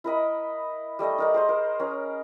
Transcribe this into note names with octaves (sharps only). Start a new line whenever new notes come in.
E4 A#4 D#5 B5
G3 A3 A4 D#5
D#4 A#4 D5
G#4 C5 D#5
A#4
C#4 A#4